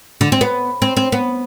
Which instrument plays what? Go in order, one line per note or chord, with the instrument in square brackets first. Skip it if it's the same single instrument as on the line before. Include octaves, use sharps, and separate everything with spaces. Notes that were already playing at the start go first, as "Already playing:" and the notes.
[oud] D3
C4
B3
C4
C4
B3